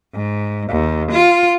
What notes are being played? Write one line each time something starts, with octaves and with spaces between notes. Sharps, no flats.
G#2
D#2
F4